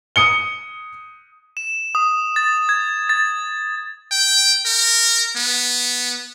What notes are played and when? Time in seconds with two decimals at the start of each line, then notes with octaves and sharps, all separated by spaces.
0.16 D#6 C#7 G7
1.57 E7
1.95 D#6
2.36 A6
2.69 G#6
3.09 A6
4.11 G5
4.65 A#4
5.36 B3